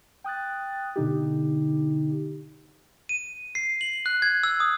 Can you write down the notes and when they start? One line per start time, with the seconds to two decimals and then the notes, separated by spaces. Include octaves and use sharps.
0.24 G5 D#6 F#6 A6
0.96 B2 D3 D#4 G4
3.09 D#7
3.55 C7
3.81 F#7
4.06 F#6
4.22 G#6
4.43 E6
4.60 D#6